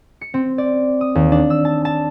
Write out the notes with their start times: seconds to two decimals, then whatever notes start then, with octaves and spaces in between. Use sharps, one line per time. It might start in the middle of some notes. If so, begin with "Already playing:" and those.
0.21 C#7
0.34 C4
0.58 D5
1.01 D#6
1.15 D#2
1.32 D4
1.50 E6
1.65 A5
1.85 A5